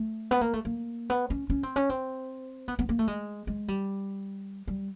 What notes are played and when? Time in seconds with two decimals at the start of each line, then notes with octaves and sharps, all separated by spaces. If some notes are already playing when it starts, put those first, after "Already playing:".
Already playing: A3
0.31 B3
0.41 A#3
0.53 A3
0.65 A#3
1.10 B3
1.30 C#4
1.50 C#4
1.63 C4
1.76 C#4
1.89 C4
2.68 B3
2.79 B3
2.89 A#3
2.99 A3
3.08 G#3
3.47 G#3
3.68 G3
4.68 G3